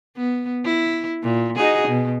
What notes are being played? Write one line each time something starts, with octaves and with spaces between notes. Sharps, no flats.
B3
E4
A#2
D#4 F#4 G#4
B2